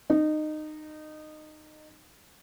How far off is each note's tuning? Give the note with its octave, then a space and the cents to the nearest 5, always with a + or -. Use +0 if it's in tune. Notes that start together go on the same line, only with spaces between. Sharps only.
D#4 -20